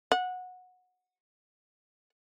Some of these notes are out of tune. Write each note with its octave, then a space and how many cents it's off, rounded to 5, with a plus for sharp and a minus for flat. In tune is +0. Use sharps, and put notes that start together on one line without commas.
F#5 -20